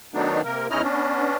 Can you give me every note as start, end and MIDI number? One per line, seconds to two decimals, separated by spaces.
0.14 0.41 51
0.14 0.41 54
0.14 0.41 57
0.14 0.41 59
0.14 0.41 62
0.14 0.41 63
0.44 0.67 48
0.44 0.67 58
0.44 0.67 70
0.70 0.82 40
0.70 0.82 61
0.70 0.82 63
0.70 0.82 64
0.70 0.82 75
0.70 0.82 89
0.82 1.37 59
0.82 1.37 61
0.82 1.37 62